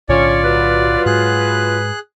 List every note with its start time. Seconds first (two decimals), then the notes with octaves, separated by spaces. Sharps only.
0.09 B1 A2 D3 C#4 F4 C#5 D5
0.44 F#3 B4
1.06 G#2 G#3 G#4 F#6